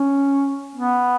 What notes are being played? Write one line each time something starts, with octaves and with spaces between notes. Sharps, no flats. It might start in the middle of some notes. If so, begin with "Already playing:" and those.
Already playing: C#4
B3